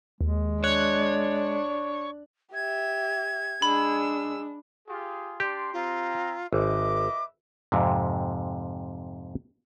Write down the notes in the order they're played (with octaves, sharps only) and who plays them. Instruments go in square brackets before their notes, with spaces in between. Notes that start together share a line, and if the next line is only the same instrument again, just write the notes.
[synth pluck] D#2 [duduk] G#3
[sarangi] D4 [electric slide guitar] C#5 [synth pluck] F#6
[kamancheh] G4 E5 [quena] G#6
[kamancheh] G#3 E6 [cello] D4 [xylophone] B5
[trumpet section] F4 G4 G#4
[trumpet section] D4 D5 C6 [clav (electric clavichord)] G4
[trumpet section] C4 A#5 [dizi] F4
[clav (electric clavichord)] G#1 [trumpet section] B4 D#5 E5 [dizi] D6
[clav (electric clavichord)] F2 G#2 C3